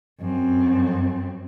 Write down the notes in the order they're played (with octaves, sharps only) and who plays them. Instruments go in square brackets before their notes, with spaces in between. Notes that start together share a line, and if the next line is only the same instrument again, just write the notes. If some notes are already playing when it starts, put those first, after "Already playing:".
[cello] F#2 C4